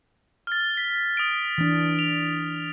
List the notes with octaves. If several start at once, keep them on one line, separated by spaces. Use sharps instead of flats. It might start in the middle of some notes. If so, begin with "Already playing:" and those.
F6 A6
B6
D#6 D7
E3 D4
F7